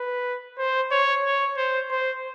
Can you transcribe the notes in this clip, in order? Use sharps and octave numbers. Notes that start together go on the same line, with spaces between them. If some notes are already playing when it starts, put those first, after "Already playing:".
Already playing: B4
C5
C#5
C#5
C5
C5